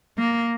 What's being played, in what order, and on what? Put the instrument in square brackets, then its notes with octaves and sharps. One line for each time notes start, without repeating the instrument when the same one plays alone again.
[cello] A#3